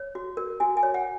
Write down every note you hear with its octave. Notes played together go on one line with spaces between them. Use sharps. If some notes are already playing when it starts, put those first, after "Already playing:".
Already playing: C#5
F#4
A#4
F#4 G#5
G#5
C#5
F#5